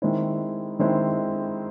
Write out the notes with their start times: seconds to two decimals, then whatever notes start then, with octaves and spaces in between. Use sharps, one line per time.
0.02 D#3 G#3 C4 E4
0.79 D#3 G#3 C4 E4